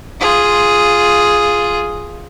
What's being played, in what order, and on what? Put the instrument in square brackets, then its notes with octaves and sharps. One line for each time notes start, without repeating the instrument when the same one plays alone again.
[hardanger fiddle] F4 G#4